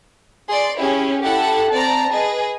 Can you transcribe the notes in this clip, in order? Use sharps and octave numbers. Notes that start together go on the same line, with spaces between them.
G#4 D5 C6
C#4 E4 G4 G#4
E4 G4 A4 F#5
C4 D5 A5 A#5
G#4 B4 D#5